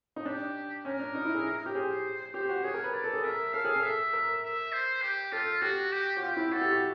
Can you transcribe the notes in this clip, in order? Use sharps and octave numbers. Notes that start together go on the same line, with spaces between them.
D#4
D4 G4
C#4 A#4
D4
D#4
E4
G#4
G4
G#4 C5
G4 C5
F#4
G#4 C#5
A#4
B4
D5
A4
G#4
A#4 E5
A4 F5
G#4
A4
E5
A#4
E5
C5
G4
F4 A4
F#4 G4
G4
F#4
F4 G4
E4
F#4 A4
G4
F#4